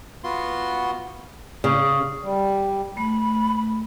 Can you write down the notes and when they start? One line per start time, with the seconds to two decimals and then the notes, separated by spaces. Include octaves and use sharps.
0.24 B3 F4 F#4 C6
1.64 C#3
2.24 G3
2.97 A3 B5